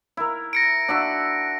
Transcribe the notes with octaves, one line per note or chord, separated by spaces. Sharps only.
E4 A#4
A#6 C#7 D7
D4 F#4 E5